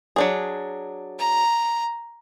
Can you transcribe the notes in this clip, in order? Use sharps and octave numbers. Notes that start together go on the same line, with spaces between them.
F#3 D4 G#4
A#5